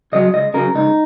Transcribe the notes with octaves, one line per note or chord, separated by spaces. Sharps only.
C#3 F#3 D#5
C#2 D#5
C#3 F#3 A#4
C#2 D#4